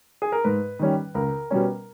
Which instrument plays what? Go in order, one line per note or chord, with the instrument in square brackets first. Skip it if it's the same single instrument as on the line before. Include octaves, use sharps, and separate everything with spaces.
[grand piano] G#4
A#4
G#2 B4
D#3 G3 C#4
C#2 A#4
B2 G3 C#4